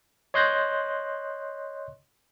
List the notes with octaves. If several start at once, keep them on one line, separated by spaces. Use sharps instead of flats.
C#5 D#5 C6 F#6 G6 A#6